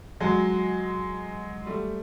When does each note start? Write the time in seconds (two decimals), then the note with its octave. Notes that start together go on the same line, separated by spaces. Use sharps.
0.20 F#3 G#3
1.66 G3 A3